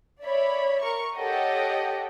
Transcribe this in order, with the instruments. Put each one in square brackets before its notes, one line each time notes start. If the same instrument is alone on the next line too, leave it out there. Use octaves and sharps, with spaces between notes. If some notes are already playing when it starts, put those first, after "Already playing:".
[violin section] C#5 D5 E5 B5
A#4 C#6
G4 A4 C#5 D#5 F#5 G5